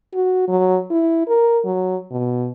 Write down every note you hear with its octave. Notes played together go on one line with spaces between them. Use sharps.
F#4
F#3
E4
A#4
F#3
B2